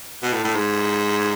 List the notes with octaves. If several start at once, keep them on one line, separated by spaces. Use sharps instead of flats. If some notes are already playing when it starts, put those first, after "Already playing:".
B2
A2
A2
G#2